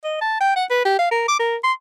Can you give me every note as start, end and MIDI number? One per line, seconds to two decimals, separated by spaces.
0.04 0.20 75
0.21 0.39 81
0.41 0.54 79
0.56 0.65 78
0.70 0.84 71
0.85 0.99 67
0.99 1.10 77
1.11 1.23 70
1.28 1.36 86
1.40 1.56 70
1.64 1.73 84